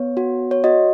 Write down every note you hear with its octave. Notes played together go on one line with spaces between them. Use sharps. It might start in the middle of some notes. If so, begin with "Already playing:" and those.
Already playing: B3 C#5
F#4
C#5
F#4 D#5